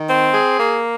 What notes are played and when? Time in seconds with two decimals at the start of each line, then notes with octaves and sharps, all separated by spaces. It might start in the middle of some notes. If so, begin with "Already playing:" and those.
Already playing: D#3
0.08 C4
0.34 G#4
0.60 A#3